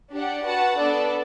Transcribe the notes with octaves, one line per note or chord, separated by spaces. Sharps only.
D4 G4 D5 F#5
F#4 B4 F#5 A5
B3 D4 A4 D5